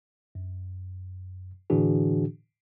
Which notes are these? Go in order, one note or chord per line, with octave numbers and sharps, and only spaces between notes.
F#2
A2 D3 E3 D4 F#4 G#4